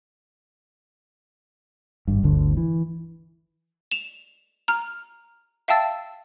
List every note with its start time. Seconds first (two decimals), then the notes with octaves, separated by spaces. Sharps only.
2.08 G#1 G2
2.23 G1 D2 D3
2.57 E3
3.91 E7 F7
4.68 A#5 F6
5.68 E5 F5 G5 A5 E6 A6